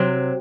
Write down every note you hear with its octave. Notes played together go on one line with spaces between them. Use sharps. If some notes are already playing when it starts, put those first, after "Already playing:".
Already playing: C3 F#3 C4